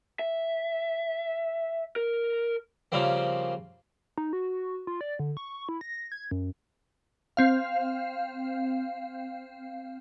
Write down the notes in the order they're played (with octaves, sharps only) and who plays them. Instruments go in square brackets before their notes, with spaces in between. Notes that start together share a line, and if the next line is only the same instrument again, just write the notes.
[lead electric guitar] E5
A#4
[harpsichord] C#3 F3 G3 A#3 C4
[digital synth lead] D#4
F#4
F4
D5
D3
C#6
E4
A#6
G#6
F#2
[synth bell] C4 F5